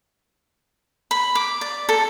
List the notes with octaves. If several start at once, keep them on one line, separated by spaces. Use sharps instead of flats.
B5
D6
D5
A4